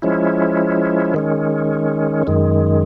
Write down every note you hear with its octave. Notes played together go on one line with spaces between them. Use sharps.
F3 G#3 C#4 E4
D#3 G#3 C#4
F#2 D#3 G#3